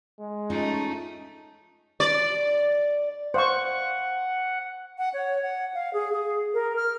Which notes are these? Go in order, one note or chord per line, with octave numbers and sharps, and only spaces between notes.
G#3
A3 C#4 D#4 F4 D#5
D5
C5 F5 F#5 C#6
F#5
C#5
F#5
F5
G#4
G#4
A#4
F6